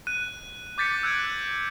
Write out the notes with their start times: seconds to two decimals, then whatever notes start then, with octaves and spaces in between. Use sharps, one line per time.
0.07 F#6 D#7
0.78 D6 G6 A6 B6 C#7
1.03 E6 F#6 G#6 D7